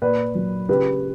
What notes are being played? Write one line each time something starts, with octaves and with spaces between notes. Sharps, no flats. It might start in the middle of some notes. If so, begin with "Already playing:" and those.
A#2 B4 D5
F#3
C#3 G4 B4